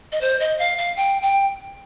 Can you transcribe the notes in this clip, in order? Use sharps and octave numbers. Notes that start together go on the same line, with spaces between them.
D#5
C5
D#5
F5
F5
G5
G5